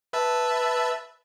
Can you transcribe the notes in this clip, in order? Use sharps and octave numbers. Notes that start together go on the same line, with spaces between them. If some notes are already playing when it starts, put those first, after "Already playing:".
B4 E5 A5